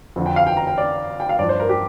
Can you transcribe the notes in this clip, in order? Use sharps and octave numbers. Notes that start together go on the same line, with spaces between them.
F2 D3 F3
G5
F5
G5
A#5
G5
D5
G5
F5
G2 F3 D5
C5
A#4
G4